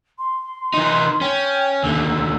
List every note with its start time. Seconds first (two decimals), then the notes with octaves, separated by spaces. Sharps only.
0.19 C6
0.74 E3 D#4
1.21 C#4 G5
1.83 D#2 D3 E6